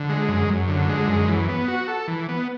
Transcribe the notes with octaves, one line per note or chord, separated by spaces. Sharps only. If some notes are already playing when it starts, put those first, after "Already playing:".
Already playing: D3
G#3
F#2
F#2
D3
G#3
F#2
E3
B3
F#4
A4
E3
B3